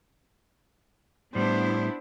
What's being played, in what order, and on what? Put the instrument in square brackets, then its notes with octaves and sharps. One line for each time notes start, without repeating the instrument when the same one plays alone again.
[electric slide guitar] A2 G3 [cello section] B3 D4 E4 [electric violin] C5